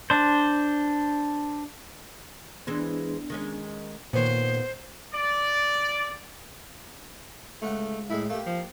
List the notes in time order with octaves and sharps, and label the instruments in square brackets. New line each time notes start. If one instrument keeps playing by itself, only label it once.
[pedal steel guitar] D4 C5
[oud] E3 G#3 C5 [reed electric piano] B3 D4
[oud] D#3 G#3 C#4
[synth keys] A#2 D#3 [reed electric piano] A#3 [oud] B3 C#5 [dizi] C5
[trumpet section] D5
[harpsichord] C#2 F#5 D6 [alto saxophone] A3
[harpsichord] A2 G#3 [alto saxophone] E4
[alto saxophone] A3 [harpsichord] A#3 G4
[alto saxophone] F3